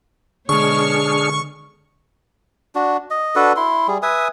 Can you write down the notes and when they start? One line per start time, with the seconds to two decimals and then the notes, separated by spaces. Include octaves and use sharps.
0.49 B2 D3 G#3 D4 G#4 C#5 C#6 F6
2.75 D4 F#4
3.10 D#5
3.36 D4 F#4 A4 B4
3.56 E4 C6
3.88 G3 G#4
4.03 B4 E5 G#5 D#6